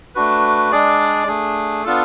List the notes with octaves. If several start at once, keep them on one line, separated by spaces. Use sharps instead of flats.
A3 D4 F#4 B4
G#3 D4 G#4 D5
A3 D4 G#4
B3 D4 F4 A4